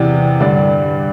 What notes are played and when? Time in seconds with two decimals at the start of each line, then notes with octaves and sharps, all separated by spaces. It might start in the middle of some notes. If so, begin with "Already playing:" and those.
Already playing: E2 C3 E3 D5
0.40 G2 D3 D5